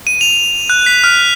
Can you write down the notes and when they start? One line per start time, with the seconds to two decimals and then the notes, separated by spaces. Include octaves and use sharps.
0.07 D#7
0.21 F7
0.70 F#6
0.86 B6
1.04 F6